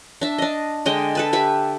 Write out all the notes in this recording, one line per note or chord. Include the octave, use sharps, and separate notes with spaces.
D4 E5
D4 D#5
D3 G#3 D#5 G5
A4 B4 A5
G4 B4 E5